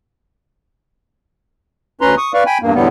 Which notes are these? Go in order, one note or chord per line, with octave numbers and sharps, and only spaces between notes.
D2 C#4 B4 A#5 C6
C#6 D#6
B4 D5 F5 C#6
G5 G#5 B5
E2 G2 A#3
E2 A2 D3 G3 B3